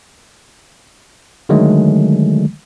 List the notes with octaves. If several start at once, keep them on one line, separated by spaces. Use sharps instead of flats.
D3 D#3 F#3 G#3 A3